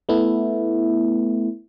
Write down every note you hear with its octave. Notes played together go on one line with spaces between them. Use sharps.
A3 B3 E4